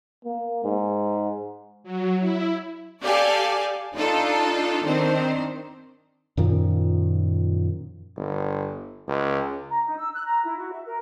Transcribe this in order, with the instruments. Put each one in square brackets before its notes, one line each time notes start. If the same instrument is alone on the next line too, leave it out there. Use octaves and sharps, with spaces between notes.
[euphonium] A#3
G#2
[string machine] F#3
E4
[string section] G4 A4 D5 F5 G#5 A5
D4 D#4 F4 A4
D#3 C4 D4 C5
[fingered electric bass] F#2 A#2 D#3 F3
[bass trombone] G1
C#2
[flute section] A#5
D#4
E6
F#6
A#5
E4
F#4
E5
A#4